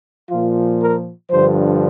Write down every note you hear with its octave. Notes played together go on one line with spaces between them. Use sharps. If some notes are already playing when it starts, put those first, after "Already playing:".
A#2 F3 F4
A#4
G2 D3 F3 C5